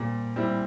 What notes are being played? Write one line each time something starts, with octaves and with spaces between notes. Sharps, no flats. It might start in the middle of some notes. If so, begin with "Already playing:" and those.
Already playing: A#2 G3 C4
G3 C4 E4